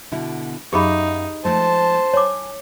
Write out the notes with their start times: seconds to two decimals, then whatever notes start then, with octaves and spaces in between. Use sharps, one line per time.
0.12 B2 D3 E4
0.73 F#2 D#4 G4 G#4 E5 F5 B5
1.45 F3 G#3 A3 C5 A5
2.13 C#5 G#5 D6